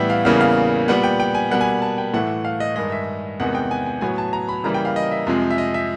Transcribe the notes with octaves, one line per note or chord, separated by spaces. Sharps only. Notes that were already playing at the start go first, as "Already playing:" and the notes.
Already playing: A2 E3 G3 B3 E5 G5
F5
E2 C#3 E3 G3 A#3 F5
F5
A#2 G3 B3 F#5
G5
G5
G#5
B2 G3 A#3 F#5
G#5
A5
G5
A2 E3 A3 F#5
F5
D#5
G2 D#3 G#3 D#5
E5
E2 C3 D#3 G#3 B3 F#5
G5
G#5
G#5
A2 F#3 B3 G#5
A5
A#5
B5
C#3 E3 G3 A#3 A#5
G5
F5
D#5
E5
F2 C3 F3 G#3
E5
D#5
E5